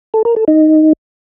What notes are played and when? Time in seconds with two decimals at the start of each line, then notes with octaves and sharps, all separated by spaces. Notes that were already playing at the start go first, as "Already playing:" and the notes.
0.14 A4
0.25 A#4
0.36 A4
0.48 D#4